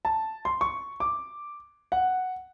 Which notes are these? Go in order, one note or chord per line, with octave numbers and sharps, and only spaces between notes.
A5
C6
C#6
D6
F#5